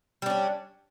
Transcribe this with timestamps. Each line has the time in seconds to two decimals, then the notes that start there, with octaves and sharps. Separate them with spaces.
0.22 G3
0.26 D4
0.30 C#4